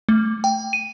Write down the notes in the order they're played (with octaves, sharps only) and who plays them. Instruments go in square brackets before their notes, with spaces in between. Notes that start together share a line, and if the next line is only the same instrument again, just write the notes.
[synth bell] A3
G5
D#7